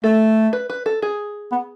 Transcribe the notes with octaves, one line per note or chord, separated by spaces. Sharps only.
A3 A4
B4
B4
A4
G#4
B3